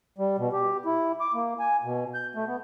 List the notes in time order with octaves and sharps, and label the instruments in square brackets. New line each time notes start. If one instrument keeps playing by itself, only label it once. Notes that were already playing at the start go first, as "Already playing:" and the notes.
[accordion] G3
B2
G4
E4
D6
A#3
G#5
B2
G6
A3
B3